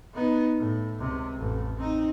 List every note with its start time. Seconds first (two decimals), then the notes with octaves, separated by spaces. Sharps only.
0.14 B3 D#4
0.58 A2
0.97 C#2 C3
1.37 A1 F2
1.77 C4 D#4